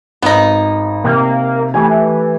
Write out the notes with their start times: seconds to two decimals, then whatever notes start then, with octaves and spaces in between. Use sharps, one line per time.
0.22 G#1 B3 D#4
1.04 C3 A#3
1.74 E3 A3 G4 G#5